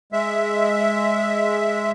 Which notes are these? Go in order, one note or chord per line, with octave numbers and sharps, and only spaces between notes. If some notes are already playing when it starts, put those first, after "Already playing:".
G#3 E5